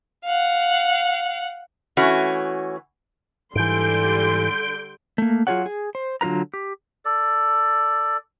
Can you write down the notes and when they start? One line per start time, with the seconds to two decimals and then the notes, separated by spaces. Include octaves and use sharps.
0.25 F5 F#5
1.97 E3 A3 C#4 F#4
3.55 G#2 D3 E3 G3 C6 G6 D7
5.18 A3 A#3
5.47 F#3 F4 G#4 A4 C#5 F#5
5.66 G#4
5.95 C5
6.21 D3 F#3 F4 B4 A#5
6.54 G4
7.05 A4 D5